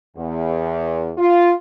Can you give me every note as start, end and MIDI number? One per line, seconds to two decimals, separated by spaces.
0.17 1.11 40
1.18 1.52 65